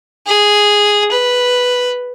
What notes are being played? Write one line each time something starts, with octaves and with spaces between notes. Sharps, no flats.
G#4
B4